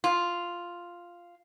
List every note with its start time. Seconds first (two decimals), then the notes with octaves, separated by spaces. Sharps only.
0.04 F4